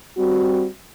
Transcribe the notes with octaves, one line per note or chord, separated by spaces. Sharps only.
G3 C4 F#4